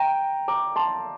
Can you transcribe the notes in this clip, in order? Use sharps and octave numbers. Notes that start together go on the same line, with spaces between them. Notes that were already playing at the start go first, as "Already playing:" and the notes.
Already playing: G5 A#5
A#5 D6
A5 C6